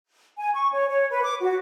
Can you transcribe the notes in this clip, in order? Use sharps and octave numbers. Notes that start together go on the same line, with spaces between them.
G#5
C#6
C#5
C#5
B4
D6
F#4